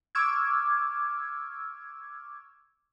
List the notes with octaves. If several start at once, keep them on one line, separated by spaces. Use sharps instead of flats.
C#6 D6 E6 F6 G#6